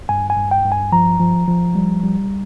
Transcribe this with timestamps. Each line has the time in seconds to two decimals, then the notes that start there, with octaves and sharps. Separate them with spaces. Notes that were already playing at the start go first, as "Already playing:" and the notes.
0.09 G2 G#5
0.30 G#5
0.37 G2
0.51 G5
0.65 G2
0.72 G#5
0.92 F3 A#5
1.19 F3
1.48 F3
1.75 G3
2.03 G3